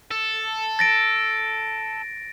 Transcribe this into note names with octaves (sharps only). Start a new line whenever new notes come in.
A4
A6 A#6 D7